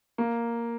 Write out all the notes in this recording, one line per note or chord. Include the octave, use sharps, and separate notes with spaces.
A#3